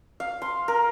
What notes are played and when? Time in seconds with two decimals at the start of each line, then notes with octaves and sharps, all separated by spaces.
0.20 F5
0.42 C6
0.68 A#4